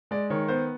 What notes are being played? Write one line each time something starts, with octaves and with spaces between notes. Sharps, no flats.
G#3 D5
D#3 C#5
B3 C5